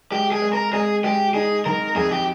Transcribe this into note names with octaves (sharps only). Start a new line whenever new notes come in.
G#3 G4
G#4
G#3
A#4
G#3 G#4
G#3 G4
D#4 G#4
D#3 A#4
F2 G#4
G4